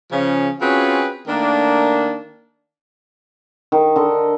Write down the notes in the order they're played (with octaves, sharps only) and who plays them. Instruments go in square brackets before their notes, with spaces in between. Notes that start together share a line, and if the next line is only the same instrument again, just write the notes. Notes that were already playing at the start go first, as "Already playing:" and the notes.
[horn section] C#3 F3 C#4
C4 C#4 F4 F#4 G#4 B4
D#3 A3 A#3 D4
[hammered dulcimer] D#3
D3 D#5